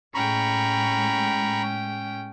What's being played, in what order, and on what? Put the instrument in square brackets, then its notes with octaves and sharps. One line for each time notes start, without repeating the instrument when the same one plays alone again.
[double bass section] A2 G#3 [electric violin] C#4 G5 [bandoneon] A#5 B5 C#6